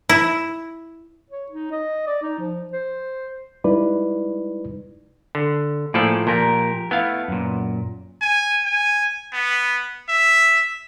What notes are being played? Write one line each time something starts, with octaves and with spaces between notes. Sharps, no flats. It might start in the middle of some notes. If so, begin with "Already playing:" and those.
E4
C#5
D#4
D#5
D5
D#4
F3
C5
G3 G#3 D#4 E4 B4 D5
D3
A2 F3 A#3 G#4 A4 D5
A#2 F3 G4 A#4
A3 B3 E4 F5
F#2 A#2
G#5
G#5
B3
E5